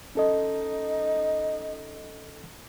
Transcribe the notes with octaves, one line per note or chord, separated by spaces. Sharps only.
C#4 D#4 A4 D#5